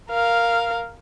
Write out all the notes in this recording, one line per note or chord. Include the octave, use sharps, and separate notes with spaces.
A#4 F5